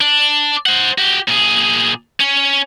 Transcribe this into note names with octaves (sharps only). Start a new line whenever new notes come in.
D4
C5 F#5
F#4 G4
A#2 G#4
C#4